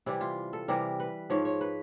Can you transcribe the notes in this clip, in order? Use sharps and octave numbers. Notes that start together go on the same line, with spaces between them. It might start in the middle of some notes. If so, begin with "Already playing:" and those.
C3 E3 G3 E4
F4
A4
C3 E3 G3 A#4
B4
G#2 F3 C#5
C#5
B4